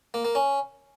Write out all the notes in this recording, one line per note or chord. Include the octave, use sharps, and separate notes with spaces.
A#3
A#3
C#4